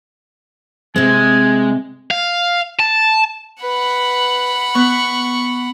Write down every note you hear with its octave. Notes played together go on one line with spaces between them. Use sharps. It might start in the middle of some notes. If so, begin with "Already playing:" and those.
C3 G#3 C4 G#5
F5
A5
B4 F#5 B5
B3 C#6